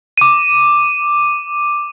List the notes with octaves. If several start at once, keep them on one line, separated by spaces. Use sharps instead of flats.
D6 D#7